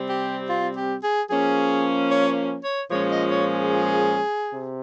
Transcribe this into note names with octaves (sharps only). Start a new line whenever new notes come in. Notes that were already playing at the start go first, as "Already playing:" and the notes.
Already playing: C3 G3 C4
G4
F4
G4
G#4
F3 A#3 C#4 G#4
C#5
C#5
A#2 F3 G#3 C#4 C#5
D#5
C#5
G#4
C3